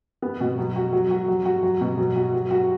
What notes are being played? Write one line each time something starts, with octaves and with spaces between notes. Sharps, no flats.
B3
B2
F#3
F#4
F#3
F#4
F#3
F#4
F#3
B2
F#3
F#4
F#3
F#4